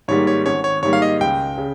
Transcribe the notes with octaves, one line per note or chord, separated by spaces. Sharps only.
G#2 D#3 G3 A#3 C#5
C#5
G#1 C#5
C#5
G#2 D#3 G3 A#3 C#5
F5
D#5
C#2 G5
C#3